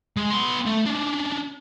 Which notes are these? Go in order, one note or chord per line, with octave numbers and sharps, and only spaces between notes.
G#3
B3 C6
A3
C#4 D4